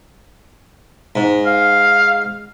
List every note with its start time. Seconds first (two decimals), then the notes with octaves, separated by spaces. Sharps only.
1.16 G#2
1.46 F5